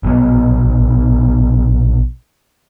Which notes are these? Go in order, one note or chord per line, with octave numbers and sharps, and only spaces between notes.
A#1 B2 F#3 B3